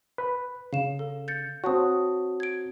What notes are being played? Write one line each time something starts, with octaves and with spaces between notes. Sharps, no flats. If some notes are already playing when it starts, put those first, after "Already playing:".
B4
C#3 F5 E7
A4
G6 A6 C#7
C4 F#4 C#5 A5 D#6
G#6 D7